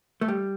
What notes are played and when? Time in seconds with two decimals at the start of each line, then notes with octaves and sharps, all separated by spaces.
0.21 A3
0.28 G3